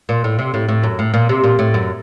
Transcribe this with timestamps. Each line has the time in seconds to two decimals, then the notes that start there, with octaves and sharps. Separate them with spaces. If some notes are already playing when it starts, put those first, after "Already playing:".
0.09 A#2
0.24 A2
0.39 C3
0.54 A2
0.68 A2
0.83 F#2
0.99 A2
1.14 A#2
1.29 C3
1.43 A#2
1.59 A2
1.74 F#2